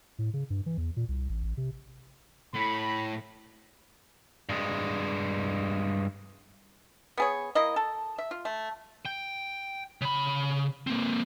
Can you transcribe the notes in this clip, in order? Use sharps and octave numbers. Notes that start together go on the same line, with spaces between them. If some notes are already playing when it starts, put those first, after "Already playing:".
A2
C#3
G2
E3
E2
A#2
C2
A1
A1
C3
A2 B5
G2 G#3
B3 G#4 C#5
A#3 E4 D#5
A4
E5
F4
A3
G5
C#3 B5
A#3 C4